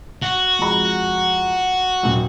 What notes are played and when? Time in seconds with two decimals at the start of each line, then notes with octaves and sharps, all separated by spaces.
0.22 F#4
0.59 F2 G#3 A#5
2.03 D#1 F#2